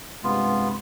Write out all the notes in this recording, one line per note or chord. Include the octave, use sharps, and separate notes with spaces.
G2 C3 G#3 B3 F4